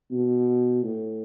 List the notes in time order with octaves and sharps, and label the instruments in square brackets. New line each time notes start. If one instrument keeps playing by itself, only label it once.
[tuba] B2
A2